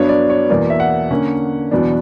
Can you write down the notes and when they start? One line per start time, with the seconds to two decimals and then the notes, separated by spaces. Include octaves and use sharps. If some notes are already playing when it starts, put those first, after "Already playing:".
Already playing: G2 F#3 B3 D4 C#5
0.09 D5
0.30 C#5
0.49 E2 B2 A#3 D5
0.70 E5
0.80 F#5
1.11 D3 A#3 C#4
1.71 E2 B2 F#3 B3 D4